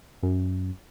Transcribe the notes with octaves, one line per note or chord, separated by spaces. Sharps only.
F#2